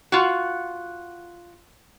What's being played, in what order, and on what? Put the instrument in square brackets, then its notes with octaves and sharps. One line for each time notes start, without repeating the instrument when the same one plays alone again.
[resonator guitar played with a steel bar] F4 F#4